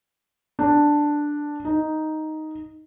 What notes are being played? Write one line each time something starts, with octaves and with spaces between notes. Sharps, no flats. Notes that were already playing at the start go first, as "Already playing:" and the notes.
D4
D#4